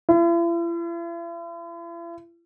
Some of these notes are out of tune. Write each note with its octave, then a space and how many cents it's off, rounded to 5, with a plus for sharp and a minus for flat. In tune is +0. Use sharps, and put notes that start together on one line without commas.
E4 +45